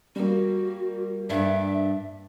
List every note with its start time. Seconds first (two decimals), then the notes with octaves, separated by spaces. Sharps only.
0.16 G3 A#3 F#4
1.30 G2 D4 E5